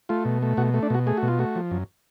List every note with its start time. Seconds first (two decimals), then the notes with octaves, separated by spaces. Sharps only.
0.09 A3 F4
0.25 B2
0.42 A3
0.57 B2 F#4
0.74 A3
0.83 D4
0.90 B2 F#4
1.07 A3 G#4
1.17 F#4
1.23 B2
1.28 F4
1.39 A3 F#4
1.55 F3
1.71 F#2